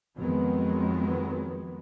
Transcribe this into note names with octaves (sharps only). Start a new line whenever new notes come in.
F2 D#3 F#3 G#3 B3